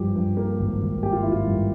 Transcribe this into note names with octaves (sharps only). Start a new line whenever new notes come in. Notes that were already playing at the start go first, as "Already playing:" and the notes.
Already playing: G2 F3 G4
G2
A#3
G#1
G#1
A#3 G4
F4
G#1 E4
F4
G2